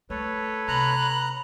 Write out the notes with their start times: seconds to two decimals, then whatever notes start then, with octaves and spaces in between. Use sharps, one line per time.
0.10 A3 A4 B4 C#5
0.68 C3 A#5 B5 F#6